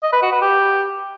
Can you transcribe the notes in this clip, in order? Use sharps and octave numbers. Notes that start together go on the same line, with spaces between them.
D#5
B4
F#4
B4
G4